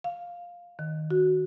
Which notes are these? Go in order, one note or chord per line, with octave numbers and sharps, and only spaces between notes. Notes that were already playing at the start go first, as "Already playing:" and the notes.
F5
D#3
F#4